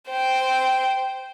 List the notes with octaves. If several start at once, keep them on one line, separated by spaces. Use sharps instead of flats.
C5 G5